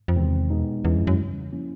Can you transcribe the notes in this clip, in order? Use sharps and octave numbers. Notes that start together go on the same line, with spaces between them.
F2
E2 C3 D#3 G#3 C4
B2 G#3 B3 D#4
E2 D#3 G#3 C#4 E4
F2
F#2
C#3 E3 G3
F3 A#3 C#4 E4